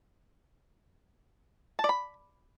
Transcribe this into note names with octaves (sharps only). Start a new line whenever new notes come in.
A5
D5
B5